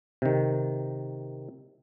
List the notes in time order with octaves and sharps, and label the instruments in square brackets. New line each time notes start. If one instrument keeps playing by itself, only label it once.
[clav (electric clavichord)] C3 D#3